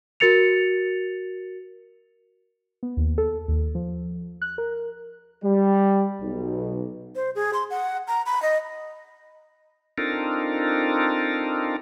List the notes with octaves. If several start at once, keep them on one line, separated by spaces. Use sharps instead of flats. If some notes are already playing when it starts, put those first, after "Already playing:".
F#4 A#4 A6 C#7 F7
B3
D#2
A4
D#2
F3
F#6
A#4
G3
B1
C5
G#4
C6
F#5
A#5
B5
D#5
C4 D4 D#4 F4 A4 A#4